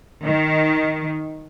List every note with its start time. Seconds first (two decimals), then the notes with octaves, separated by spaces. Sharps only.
0.23 D#3